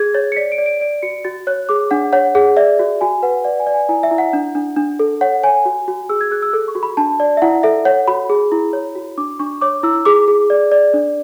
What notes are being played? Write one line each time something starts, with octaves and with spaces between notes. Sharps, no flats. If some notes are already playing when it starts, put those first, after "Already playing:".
Already playing: G#4 G#6
C#5 A6
C#7
D5 B6
D7
D5
D7
D5 D7
F#4 C#7
F#4 A6
C#5 F#6
G#4 D6
D4 F#5
C#5 F#5
G#4 F#5
D5 E5
F#4
F#4 G#5
B4 F#5
D5 F#5
G#5
D5
G#5
E4 G#5
E5
E4
F#5
D4
D4
D4
A4
C#5 F#5
C#5 G#5
F#4
F#4
G#4 E6
G#6
G#4 F#6
E6
A4
C#6
F#4
B5
D4 A5
D5
E5
E4 F#5
A4 E5
C#5 F#5
F#4 B5
G#4
E4
C#5
F#4
D4 D6
D4 C#6
C#5 D6
E4 E6
G#4 D6
G#4
D5
D5
D4